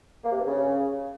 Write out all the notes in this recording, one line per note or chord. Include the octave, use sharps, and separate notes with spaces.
A#3
C3
G2
C#3